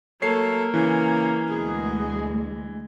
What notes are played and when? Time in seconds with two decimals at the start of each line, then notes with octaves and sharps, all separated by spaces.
0.22 F#3 A3 A#3 A4 C#5 C7
0.74 C#3 E3 C#4
1.50 D2 B2 G#3 B3 G#4